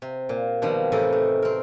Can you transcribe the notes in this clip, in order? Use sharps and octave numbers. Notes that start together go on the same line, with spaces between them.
C3
A#2
B2 D#3 F3 G3
A2 C3 E3 D#4 A4 D#5
A3
C4 A#4